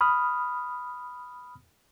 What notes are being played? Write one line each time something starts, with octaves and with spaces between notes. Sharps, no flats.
B5 D#6 F6